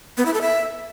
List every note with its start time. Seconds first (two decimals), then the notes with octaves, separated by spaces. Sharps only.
0.17 B3
0.25 E4
0.33 A4
0.42 E5